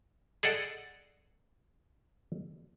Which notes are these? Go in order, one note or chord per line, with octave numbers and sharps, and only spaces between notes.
G#4 A4 D5 D#5 F#5